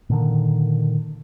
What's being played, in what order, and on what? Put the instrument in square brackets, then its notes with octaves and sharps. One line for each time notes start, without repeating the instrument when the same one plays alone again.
[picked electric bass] A#2 D3 D#3